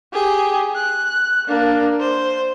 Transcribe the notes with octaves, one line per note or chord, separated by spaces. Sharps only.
G4 G#4
F#6
A#3 D4
C5